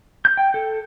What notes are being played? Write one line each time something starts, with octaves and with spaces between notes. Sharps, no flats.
G6
G5
A4